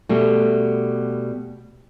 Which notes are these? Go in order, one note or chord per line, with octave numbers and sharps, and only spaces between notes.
B2 G3 A3